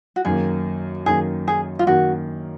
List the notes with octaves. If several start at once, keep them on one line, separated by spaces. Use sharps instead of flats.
F#4
F#2 D#3 A#3 G#4
F#2 D#3 A#3 G#4
G#4
F4
F#2 D#3 A#3 F#4